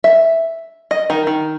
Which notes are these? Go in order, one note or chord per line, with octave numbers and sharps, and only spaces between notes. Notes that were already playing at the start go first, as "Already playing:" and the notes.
E5
D#5
D#3
D#3